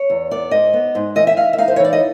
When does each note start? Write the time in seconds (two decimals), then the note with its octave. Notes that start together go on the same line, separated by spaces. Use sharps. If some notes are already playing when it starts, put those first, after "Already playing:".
Already playing: C#5
0.10 E2
0.31 B3 D5
0.51 G#2 D#5
0.73 B3
0.95 G#2
1.15 E3 D#5
1.27 E5
1.37 E3 F5
1.53 E5
1.58 D#4 F5
1.68 C5
1.76 C#5
1.79 E3
1.85 D5
1.93 D#5